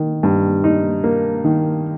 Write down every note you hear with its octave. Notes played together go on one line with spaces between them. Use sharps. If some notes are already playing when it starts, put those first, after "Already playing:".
Already playing: D#3
G2
D#4
A#3
D#3